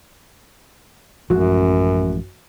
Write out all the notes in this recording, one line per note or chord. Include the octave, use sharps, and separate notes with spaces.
A1 F#2 F3 G#3 F#4